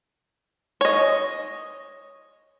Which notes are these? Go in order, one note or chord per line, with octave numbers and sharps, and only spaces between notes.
C#5 D#5